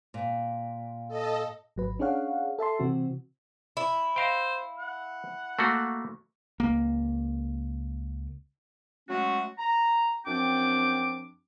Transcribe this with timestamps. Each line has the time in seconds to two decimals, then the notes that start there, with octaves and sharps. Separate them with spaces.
0.14 A#2
1.08 A4 D#5
1.76 G#1 F#3 B4
1.99 C#4 D4 G#4 C#5 F5 F#5
2.58 A4 E5 A5 C6
2.79 C3 E3 C4 F#4
3.77 E4
4.16 C5 D#5 F5 G5
4.79 F#5
5.59 A3 A#3 F#4
6.60 C#2 A#3
9.09 F#3 G#3 A3 C#4 F#4
9.58 A#5
10.26 F#2 F3 C4 D4 G5 D6